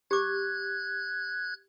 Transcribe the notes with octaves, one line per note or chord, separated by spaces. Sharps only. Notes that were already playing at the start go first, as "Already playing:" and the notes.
G4 D6 F#6 G#6